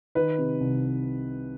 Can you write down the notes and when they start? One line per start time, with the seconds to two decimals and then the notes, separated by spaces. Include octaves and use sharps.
0.15 D#3 B4
0.38 C3
0.60 C2